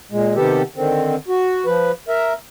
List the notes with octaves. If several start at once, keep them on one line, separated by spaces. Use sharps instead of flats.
A#2 G#3
C3 D#3 B3 G4 A4
D3 D#3 C4
F#4
F3 B4
A#4 E5